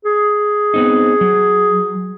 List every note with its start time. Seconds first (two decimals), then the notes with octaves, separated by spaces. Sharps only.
0.05 G#4
0.74 B3 C4 D#4
1.21 F#3